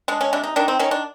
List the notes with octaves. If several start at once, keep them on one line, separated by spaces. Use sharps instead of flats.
G#3 D4
C#4
C3 D4
D#4
D#3 D4
C4
D#3 C#4
D4